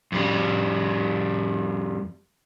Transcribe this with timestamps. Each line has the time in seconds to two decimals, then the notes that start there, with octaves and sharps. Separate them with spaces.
0.12 F2 G3